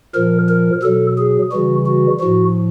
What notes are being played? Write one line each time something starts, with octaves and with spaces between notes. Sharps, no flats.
A#2 F3 A#4
A#4
B2 F#3 A4
G#4
C#3 E3 G3 F#4
F#4
A2 F3 F#4